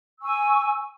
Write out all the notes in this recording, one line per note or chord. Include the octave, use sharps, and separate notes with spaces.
G#5 C#6 E6